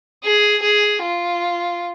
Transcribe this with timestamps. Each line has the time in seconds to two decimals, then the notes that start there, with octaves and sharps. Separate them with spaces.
0.24 G#4
0.62 G#4
1.02 F4